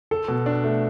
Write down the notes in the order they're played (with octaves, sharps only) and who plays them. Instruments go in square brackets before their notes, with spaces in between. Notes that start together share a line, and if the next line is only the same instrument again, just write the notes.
[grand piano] A4
B2
D4
A3